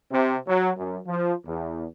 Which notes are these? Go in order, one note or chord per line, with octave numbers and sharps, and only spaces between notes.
C3
F#3
F#2
F3
E2